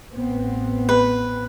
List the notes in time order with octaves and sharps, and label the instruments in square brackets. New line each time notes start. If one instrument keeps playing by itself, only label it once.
[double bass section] A1 B3 C4
[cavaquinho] B4